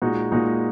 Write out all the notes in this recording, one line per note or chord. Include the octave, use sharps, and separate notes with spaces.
A#2 G#3 D#4 F#4
A#2 G#3 D#4 F#4